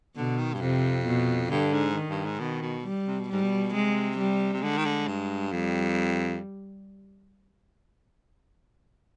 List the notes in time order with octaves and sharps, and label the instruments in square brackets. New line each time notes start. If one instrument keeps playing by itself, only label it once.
[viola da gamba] B2 [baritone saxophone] D3
[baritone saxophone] D#3
G2
[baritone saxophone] F2 [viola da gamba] C3
[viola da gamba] B2
[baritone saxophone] G2 [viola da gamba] D3
[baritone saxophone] G#2
[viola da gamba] D#3
[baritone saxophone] G2
G#2
[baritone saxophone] B2 [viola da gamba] D#3
[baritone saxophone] B2
[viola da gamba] G3
[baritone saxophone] C3
B2
[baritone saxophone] G#2 [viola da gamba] G3
[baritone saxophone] B2
[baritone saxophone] C3 [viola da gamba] G#3
[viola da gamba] G3
[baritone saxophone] C3
[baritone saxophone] D3 [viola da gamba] G#3
[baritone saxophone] D#3
D3
G2
[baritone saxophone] F2 [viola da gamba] G3